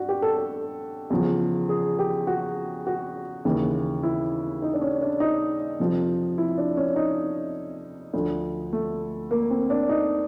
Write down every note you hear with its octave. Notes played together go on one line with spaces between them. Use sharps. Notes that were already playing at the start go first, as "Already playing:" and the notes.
Already playing: G2 F#4
G4
A4
A4
E2 C#3 F3
G#4
G4
F#4
F#4
D#2 C#3 E3
E4
D#4
D4
C#4
D4
D#4
F2 C3 F3
E4
D4
C#4
D#4
D2 D3 F3
A3
A#3
C4
D4
D#4